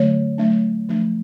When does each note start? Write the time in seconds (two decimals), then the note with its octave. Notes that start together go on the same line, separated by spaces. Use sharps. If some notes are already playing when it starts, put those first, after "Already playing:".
Already playing: D3 F#3 A3 D4 C#5
0.38 F#3 A3 D4
0.89 F3 A3 D4